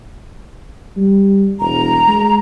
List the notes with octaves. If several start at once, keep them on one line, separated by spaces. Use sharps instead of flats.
G3
E1 A#5
G#3